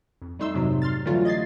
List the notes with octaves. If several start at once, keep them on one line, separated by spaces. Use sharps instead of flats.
F2
G3 A3 D#4 C6 E6
F2 G#2 C3 F#3
C6 F6 A6
D3 E3 F#3 G3 A3 F4
D#5 G#6 A6 C7